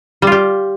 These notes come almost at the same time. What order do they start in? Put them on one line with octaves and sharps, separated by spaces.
G3 F4 G4